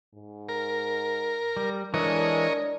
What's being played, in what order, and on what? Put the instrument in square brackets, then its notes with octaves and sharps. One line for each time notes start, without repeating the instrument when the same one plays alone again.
[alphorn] G#2
[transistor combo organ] A#4
[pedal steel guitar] G3
[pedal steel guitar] E3 G#3 A4 [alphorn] D4 [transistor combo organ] A#4 C#5 D#5